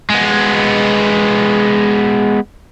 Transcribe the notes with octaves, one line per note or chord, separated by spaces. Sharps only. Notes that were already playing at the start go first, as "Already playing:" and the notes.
G#3 B3